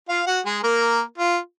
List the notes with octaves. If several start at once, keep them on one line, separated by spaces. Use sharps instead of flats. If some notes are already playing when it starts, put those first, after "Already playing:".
F4 F5
F#4 F#5
G#3 G#4
A#3 A#4
F4